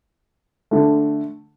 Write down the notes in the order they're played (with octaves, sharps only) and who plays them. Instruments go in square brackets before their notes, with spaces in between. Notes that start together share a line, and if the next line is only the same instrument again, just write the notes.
[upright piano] D3 A3